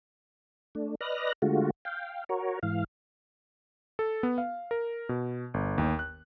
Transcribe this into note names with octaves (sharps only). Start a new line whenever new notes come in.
A3 D4
B4 D5 D#5 F6 F#6 A#6
D3 G#3 A3 F4 F#4
F5 G5
F#4 A#4 C#5
G#2 E3 F5
A4
B3
F5
A#4
B2
G1
D#2
F#6